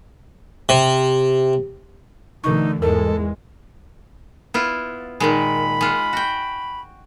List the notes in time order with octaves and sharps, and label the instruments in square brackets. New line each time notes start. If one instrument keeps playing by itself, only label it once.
[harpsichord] C3
[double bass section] B2 D3 A3 [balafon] E3 C#6 [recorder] D#4
[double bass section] E2 G#2 G#3 [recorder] A4 [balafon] A#4
[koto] B3 E4 F4
[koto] A#2 D#3 G#3 [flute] B5
[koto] G#3 F4 F#5
F#4 G5